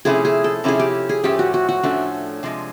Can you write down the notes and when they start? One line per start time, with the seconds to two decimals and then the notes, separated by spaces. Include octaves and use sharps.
0.05 C3 F3 A3 C#4 E4 G#4
0.25 G#4
0.44 A4
0.64 C3 F3 A3 C#4 E4 G#4
0.79 G4
1.09 G#4
1.23 A2 F3 A3 C#4 G4
1.39 F#4
1.54 F#4
1.69 F#4
1.83 A2 F3 A3 C#4 D4
2.43 C3 F3 G#3